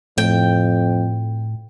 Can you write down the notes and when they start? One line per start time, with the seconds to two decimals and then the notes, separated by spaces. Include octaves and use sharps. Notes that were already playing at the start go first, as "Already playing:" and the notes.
0.18 F2 A2 G5